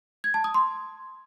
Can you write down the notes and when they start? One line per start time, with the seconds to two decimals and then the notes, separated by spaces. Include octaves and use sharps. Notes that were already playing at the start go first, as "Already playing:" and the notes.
0.24 G#6
0.34 A5
0.44 D#6
0.54 C6